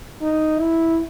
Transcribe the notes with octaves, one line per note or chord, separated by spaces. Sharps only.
D#4
E4